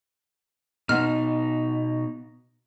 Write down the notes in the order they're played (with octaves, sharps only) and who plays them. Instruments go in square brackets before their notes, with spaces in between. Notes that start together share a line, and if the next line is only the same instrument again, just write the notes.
[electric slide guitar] B2 D#4 [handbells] B3 F6